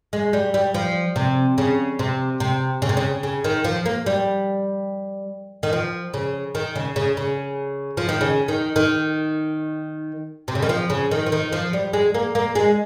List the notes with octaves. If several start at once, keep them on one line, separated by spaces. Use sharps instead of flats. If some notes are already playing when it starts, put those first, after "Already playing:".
G#3
G3
G3
F3
C3
C#3
C3
C3
C#3
C3
C#3
C#3
D#3
F3
A#3
G3
D#3
F3
C#3
D#3
C#3
C#3
C#3
F3
D#3
C#3
D#3
D#3
C3
C#3
D#3
F3
C#3
D#3
F3
D#3
F3
G3
G#3
A#3
A#3
G#3